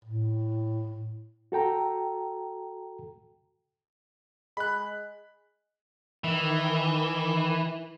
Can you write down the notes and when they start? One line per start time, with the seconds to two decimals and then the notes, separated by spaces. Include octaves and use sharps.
0.05 A2
1.52 F#4 A4 G5 A#5
4.57 G#3 B5 F#6
6.24 D#3 E3